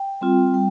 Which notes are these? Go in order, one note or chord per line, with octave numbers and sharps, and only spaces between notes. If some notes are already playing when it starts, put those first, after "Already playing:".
Already playing: G5
G3 C4 F4
G3 G5